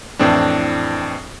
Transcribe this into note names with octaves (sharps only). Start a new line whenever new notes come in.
F2 A2 E3 C4 D4